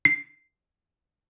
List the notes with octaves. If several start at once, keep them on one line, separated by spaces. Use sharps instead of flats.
C7